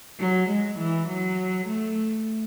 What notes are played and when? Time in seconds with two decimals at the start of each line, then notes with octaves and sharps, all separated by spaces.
0.19 F#3
0.49 G#3
0.78 E3
1.07 F#3
1.66 A3